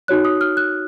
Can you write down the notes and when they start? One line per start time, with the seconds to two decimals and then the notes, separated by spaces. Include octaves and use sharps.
0.08 D#4 F#4 C#5 F#6
0.25 D#6
0.41 F6
0.57 F#6